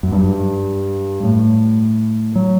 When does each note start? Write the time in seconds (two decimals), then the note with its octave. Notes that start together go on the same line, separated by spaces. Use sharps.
0.03 F#2
0.11 G2
1.23 A2
2.36 F#3